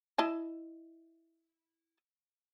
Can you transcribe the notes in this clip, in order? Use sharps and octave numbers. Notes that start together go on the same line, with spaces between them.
E4 D#5 A5